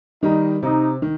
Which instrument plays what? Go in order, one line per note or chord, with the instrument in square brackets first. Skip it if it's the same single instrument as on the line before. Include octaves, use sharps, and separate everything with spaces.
[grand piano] D#3 G3 [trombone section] D#4
[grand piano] C3 [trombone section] D#4
[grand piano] D#3